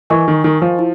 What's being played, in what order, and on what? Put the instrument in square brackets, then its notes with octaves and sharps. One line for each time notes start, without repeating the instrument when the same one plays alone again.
[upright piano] E3 [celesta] A#4 D#5 G#5 C#6
[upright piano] D#3
D#3
F3
[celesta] E4